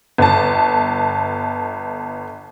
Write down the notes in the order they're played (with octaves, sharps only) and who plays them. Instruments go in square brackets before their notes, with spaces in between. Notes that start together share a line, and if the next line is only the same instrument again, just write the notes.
[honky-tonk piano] G1 A5